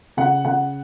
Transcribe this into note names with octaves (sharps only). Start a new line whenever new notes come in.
C#3 F#5
C#3 F#5